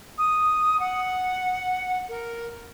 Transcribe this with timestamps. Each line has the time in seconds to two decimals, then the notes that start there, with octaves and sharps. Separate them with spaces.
0.17 D#6
0.79 F#5
2.08 A#4